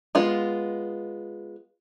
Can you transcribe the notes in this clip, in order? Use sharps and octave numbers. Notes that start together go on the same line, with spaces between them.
G#3 B3 F4